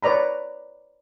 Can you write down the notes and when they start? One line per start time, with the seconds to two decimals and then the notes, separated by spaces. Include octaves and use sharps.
0.03 B4 C#5 D5 A#5 B5